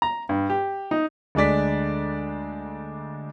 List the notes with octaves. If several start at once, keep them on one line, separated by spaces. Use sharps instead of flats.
A#5
G2
G4
D#4
D2 G#3 D4 D5 B6